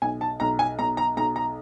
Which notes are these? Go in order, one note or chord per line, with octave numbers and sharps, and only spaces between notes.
B1 G#5
A5
B1 A#5
G#5
B1 A#5
A#5
B1 A#5
A#5